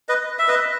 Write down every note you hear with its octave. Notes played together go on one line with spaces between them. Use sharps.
B4 D#5
E5
B4 D#5